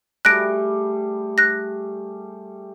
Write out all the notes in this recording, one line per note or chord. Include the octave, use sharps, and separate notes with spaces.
G3 A3 G#4 F#6 A#6 D7
F#6 A#6